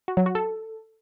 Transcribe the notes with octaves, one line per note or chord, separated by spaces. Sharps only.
F#4
F#3
F#4
A4